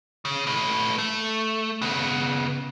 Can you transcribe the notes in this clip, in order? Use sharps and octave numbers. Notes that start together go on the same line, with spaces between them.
C#3
A3 B4
A3
C#3 B3